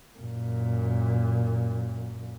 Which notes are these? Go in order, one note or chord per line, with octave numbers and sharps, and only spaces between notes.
F#2 A#2